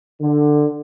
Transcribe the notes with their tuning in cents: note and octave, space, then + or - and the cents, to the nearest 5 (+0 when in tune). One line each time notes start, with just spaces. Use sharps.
D3 +15